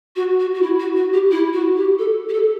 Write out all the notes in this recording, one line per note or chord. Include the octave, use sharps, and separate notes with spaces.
F#4
F#4
F#4
E4
F#4
F#4
G4
E4
F#4
G4
A4
G4
A4